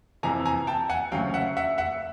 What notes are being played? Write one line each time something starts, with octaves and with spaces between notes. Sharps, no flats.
F2 C3 E3 G#5 A#5
G#5 A#5
G5 A5
F#5 G#5
D2 C#3 F#3 F5 G5
E5 F#5
E5 F#5
E5 F#5